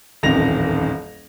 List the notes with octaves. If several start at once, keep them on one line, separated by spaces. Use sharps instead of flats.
D#1 A1 F2 D#3 A#6 F7